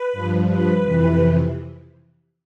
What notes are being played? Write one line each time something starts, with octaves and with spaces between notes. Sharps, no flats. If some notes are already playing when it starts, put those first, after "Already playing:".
Already playing: B4
G2 F3
B4
F2 C3 E3